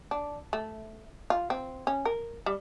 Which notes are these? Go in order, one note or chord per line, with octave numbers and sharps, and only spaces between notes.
D4
A3
F4
C4
C#4
A#4
G3